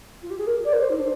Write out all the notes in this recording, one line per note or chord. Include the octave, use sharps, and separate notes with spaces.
F4
G4
G#4
A#4
D5
A#4
C5
D#4
D4